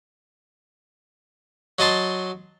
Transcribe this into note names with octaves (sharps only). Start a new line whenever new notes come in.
F#3 D#5 A5 C6